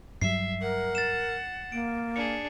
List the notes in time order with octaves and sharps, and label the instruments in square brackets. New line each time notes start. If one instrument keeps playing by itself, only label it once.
[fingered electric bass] G2 F#3 G3 [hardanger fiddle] E5 [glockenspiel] C7
[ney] A#4 [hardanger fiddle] F#5
[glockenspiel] A6 E7
[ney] A#3 [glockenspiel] D7
[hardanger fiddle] D4 G#4 [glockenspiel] C#7